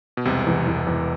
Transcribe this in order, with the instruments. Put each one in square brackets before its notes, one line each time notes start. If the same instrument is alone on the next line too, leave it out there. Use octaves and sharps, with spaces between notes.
[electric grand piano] B2
[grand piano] E1 [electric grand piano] C2 C3
[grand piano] E2
E2
E2